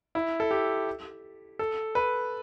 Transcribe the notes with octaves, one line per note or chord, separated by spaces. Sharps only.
E4
A4
G4
A4
B4